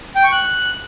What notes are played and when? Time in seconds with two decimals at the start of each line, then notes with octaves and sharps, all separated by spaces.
0.16 G5
0.24 C#6
0.32 F#6